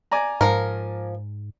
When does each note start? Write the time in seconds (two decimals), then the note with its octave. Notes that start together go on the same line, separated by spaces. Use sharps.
0.12 D5 G#5 A#5
0.41 G#2 F3 A#4